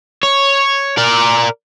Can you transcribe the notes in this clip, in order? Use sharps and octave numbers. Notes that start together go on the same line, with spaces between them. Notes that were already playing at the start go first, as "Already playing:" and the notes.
C#5
A#4 D5